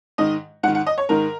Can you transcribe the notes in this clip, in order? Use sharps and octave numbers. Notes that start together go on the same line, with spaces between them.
G#2 D#3 D#5
G#2 D#3 F#5
F#5
D#5
C#5
G#2 D#3 A#4